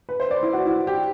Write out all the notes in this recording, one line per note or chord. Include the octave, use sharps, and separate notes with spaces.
B4
C5
D5
E4
F#4
E4
G4